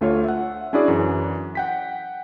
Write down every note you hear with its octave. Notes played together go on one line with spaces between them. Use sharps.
D2 A3 F4 C#5
E5 F#5
C#4 D4 E4 F#4 G#4 D5
F#2 E3
F#5 G5 B6